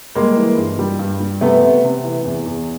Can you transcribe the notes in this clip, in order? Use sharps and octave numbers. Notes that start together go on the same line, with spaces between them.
G3 G#3 A#3
E3
G2
G3
G2
G3
C3 A3 B3
C3
C3
E3
E2
E2